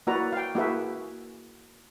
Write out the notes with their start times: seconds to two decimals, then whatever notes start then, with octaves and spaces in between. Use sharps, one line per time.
0.07 A#3 E4 F#4 B4 D5 A#5
0.33 F5 G5
0.55 A#3 E4 F#4 G#4 B4 E5